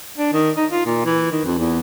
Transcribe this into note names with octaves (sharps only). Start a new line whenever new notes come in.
D4
D#3
D#4
F4
A#2
E3
D#3
F2
E2